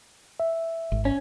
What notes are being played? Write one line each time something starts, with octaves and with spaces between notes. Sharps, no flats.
E5
G#1
C#4